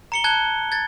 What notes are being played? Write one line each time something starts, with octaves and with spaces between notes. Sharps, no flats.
A#5 C#7 G7
A5 F#6 G#6 G7
G#6 A6